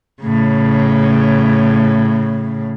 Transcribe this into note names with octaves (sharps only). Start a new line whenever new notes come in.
A2 C#3